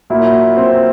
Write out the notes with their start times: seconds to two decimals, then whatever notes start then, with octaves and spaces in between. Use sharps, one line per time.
0.10 A#2 F#3 A#3 E4
0.57 C4